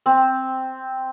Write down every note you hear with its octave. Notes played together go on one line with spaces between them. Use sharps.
C4